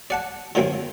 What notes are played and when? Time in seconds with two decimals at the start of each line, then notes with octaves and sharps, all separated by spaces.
0.10 D5 F#5 A5
0.55 D3 D#3 F#3 A#3 C4